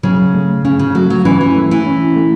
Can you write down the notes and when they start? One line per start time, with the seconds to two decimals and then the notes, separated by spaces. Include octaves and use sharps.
0.03 C#3 F#3
0.34 A3
0.65 C#3 C#4
0.79 C#3
0.95 F#3 A3
1.10 F#3
1.25 E3 C#4
1.41 E3
1.56 A3
1.71 E3
1.87 C#4
2.16 A3